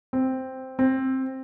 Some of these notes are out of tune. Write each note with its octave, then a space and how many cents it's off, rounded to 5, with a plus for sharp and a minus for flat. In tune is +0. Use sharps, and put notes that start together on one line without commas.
C4 +0
C4 +10